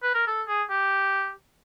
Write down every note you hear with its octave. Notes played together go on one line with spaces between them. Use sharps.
B4
A#4
A4
G#4
G4